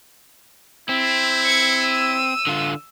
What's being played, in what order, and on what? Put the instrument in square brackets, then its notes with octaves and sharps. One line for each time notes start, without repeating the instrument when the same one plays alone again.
[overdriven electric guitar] C4 [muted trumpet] E4
[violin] G#6 C#7
E6 D#7
[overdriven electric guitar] D3 F4